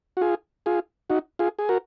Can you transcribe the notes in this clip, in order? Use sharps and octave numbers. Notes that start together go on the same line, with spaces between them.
F#4
F4 G#4
F4 G#4
D#4 F#4
F4 G#4
G#4
F#4 A#4